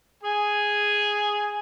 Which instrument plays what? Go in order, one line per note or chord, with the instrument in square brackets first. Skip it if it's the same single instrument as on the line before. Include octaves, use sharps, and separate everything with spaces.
[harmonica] G#4 G#5